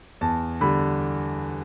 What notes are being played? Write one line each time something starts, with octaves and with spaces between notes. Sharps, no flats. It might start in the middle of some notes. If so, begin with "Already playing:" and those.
E2 A5
D3 G3 B5